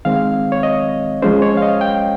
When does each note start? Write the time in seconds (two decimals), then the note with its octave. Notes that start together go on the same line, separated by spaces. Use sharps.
0.05 D#3 G#3 C4 F5
0.52 C#5
0.63 D#5
1.22 F3 G#3 C#4 C5
1.42 C#5
1.57 F5
1.62 D#5
1.81 G5